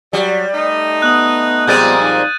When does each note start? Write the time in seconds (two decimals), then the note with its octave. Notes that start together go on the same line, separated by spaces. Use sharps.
0.13 F#3 G3 D5
0.54 A3 D#4
1.02 B3 D#6 F#6
1.67 A#2 F3 G3 G#3 C4 G6 A6 D#7
1.99 D#4